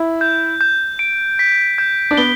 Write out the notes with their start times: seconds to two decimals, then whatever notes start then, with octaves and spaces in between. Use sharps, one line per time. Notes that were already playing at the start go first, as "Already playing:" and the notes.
Already playing: E4
0.21 G6
0.61 G6
0.99 D7
1.39 B6
1.78 G6
2.11 D4
2.17 B3 G7